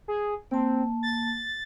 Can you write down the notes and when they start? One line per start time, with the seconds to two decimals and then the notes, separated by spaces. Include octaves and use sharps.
0.08 G#4
0.51 A#3 C4 A5
1.03 A6